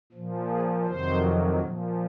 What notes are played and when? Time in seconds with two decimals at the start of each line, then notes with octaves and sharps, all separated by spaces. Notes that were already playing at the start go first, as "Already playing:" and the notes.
0.12 A#2 F3
0.49 G#4
0.86 F2 C3 D#3 F#3 C5
1.59 A#2 F3